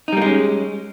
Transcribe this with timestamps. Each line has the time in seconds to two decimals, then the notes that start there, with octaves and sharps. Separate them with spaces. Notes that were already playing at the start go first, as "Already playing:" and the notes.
0.08 D#4
0.12 G3
0.17 A#3
0.22 G#3
0.26 C#4